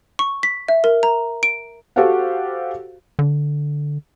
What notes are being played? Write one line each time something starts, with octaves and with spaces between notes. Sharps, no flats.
C#6
B6
E5
A#4
A#5
D7
F#4 G4 A4 C5 F5 F#5
D3